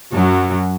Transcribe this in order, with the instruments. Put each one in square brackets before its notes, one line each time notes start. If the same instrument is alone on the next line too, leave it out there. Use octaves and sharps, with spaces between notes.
[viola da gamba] F#2 F#3